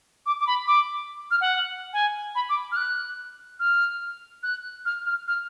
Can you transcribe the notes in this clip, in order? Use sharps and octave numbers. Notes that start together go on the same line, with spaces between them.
D6
D6
B5
D6
F6
F#5
G#5
B5
D6
F6
F#6
F6
F#6
F6
F6
F6